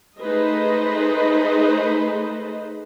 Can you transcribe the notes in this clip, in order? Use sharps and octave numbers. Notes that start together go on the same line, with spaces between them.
A3 D#4 G#4 B4 C5 D#5